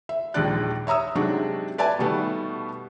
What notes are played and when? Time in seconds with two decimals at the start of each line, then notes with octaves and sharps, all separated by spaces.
0.09 E5
0.34 A#1 D#2 G#3 D4 D5 F#6
0.87 C#5 E5 A#5 D#6 E6
1.15 C3 F#3 G#3 D4 D#4 F#4
1.78 B4 D5 E5 G#5 A5
1.99 B2 D#3 G3 A3 B3